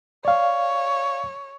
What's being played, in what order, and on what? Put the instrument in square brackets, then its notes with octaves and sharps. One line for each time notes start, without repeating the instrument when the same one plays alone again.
[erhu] C#5 [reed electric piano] D5 F5